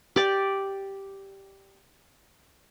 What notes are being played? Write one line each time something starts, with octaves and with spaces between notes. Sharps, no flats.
G4 D5